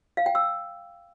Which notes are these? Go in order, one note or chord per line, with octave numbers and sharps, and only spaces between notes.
F5
G5
E6